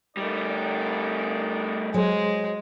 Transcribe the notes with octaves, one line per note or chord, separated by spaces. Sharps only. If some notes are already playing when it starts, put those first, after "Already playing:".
G3 A3 D#4 A#4 D5
F#3 G#3 C5 C#5